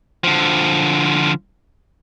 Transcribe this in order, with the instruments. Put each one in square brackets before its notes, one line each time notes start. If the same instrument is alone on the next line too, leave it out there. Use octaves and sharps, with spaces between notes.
[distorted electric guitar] D3 F3